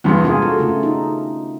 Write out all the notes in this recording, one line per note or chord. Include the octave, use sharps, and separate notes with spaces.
E2 G2 C3 B3 D4 G#4
C3 G#3 F4 G#4 A#4
F#4 A4
C#3 A3 F4
D#4